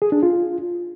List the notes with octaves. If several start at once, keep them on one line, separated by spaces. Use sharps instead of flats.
G#4
D4
F4